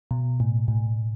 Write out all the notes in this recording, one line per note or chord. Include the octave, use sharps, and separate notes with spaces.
B2
A2
A2